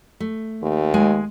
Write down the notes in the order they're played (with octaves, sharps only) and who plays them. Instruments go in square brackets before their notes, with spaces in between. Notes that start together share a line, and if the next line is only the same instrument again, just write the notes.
[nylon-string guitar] A3
[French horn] D#2
[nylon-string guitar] G#3 G#5